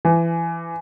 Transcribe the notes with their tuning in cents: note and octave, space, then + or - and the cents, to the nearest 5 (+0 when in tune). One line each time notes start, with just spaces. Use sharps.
E3 +25